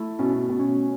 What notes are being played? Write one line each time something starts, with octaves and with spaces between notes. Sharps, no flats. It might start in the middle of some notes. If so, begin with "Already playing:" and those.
Already playing: A3 E4
B2 C#4
B2
C#4